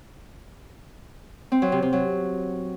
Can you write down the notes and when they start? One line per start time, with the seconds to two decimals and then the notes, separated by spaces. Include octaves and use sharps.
1.52 C4
1.62 F#3
1.72 C3
1.82 C3
1.93 F#3